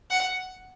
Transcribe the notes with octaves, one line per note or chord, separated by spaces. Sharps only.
F#5